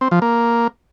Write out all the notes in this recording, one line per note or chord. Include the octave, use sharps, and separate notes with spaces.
C4
F3
A#3